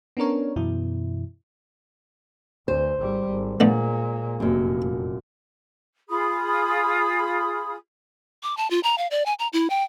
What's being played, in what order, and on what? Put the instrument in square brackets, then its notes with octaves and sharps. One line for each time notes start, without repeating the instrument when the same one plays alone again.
[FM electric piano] B3 C#4 D4 A#4 C#5
F#2 B2 E3 E4
[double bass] D2 [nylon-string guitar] C5
[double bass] G#1 G3
G#1
[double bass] A#2 G#3 [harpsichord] D3 A3 B3
[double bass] F1 [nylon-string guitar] F#2 A#2
[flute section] F4 G#4 B5 D#6
[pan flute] D6
A5
F4
A#5
F5
D5
G#5
A#5
E4
G5